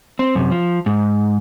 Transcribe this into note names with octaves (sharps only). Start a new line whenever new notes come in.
C4
F#2 C3
F3
G#2